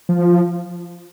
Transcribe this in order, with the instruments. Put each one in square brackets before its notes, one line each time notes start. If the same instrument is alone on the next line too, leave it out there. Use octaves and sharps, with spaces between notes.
[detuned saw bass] F3